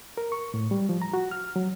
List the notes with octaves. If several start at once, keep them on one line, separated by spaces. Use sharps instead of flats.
A#4
C#6
A2
G3
F3
A#5
F#4
F6
F#3